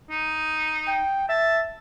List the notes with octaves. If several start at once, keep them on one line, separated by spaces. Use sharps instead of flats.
D#4
G5
E5 A5